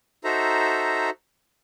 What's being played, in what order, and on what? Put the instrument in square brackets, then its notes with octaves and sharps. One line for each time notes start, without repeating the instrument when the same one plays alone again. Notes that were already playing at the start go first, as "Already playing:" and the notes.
[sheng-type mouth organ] D#4 F#4 A4 C5 E5 A#5